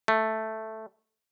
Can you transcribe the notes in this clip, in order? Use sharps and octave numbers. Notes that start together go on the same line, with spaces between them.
A3